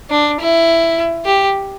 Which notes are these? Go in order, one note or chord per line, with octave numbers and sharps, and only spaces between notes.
D4
E4
G4